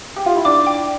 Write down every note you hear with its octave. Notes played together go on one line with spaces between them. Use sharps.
G4
F4
E4
D4 D6
G5